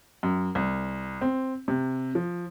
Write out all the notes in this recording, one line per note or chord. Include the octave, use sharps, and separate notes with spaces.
F#2
C2
C4
C3
F3